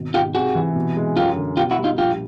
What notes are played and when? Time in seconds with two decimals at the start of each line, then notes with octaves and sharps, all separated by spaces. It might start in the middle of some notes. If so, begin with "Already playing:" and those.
Already playing: G#1 B2
0.14 G#2 F4 G4
0.34 C3 F#4 G#4
0.55 E3
0.76 B2
0.96 G#3
1.17 F#2 F4 G4
1.36 D3
1.57 B2 F4 G4
1.71 E4 F#4
1.78 G3
1.84 D#4 F4
1.98 A#1 F4 G4